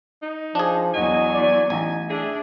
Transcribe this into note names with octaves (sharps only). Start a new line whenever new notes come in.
D#4
F3 D4 G#4
E2 F#3 D#5 G#5
D5
A1 D#4 G#5
D4 G#4 E5